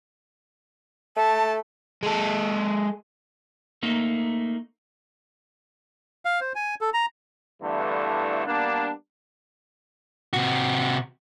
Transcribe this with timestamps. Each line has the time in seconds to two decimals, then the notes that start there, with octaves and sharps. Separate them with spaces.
1.17 A3 A5
2.03 G#3 A4
3.83 A3 A#3 D#4
6.25 F5
6.41 C5
6.55 G#5
6.81 A4
6.94 A#5
7.62 E2 G2 D3 E3 A3
8.46 G3 A#3 B3 D4
10.33 C3 F#4